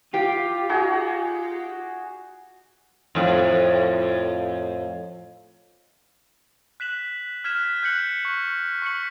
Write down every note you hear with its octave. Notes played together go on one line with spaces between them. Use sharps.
F4 G4 F5
D#4 F#4 G#4
F2 A2
F#6 B6 E7 F#7
F6 G#6 B6 E7
F#6 G6 B6 C#7 F#7
C#6
C#6 B6 C#7 F#7